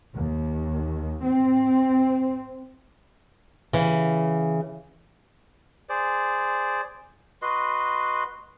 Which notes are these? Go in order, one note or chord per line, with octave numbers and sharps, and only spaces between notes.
D#2
C4
C#3 E3
G#4 C5 D5
F#4 B4 D#5 C6